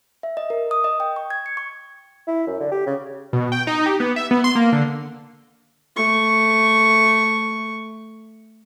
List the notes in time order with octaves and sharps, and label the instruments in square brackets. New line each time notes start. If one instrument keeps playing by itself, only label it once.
[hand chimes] E5
D#5
A#4
D#6
D#5
G5
C#6
G#6
C#7
C#6
[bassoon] E4
F#2
D3
G4
C#3
[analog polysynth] B2
G5
D#4
G4
B3
E5
B3
C6
A#3
D3
[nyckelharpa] A3 C#6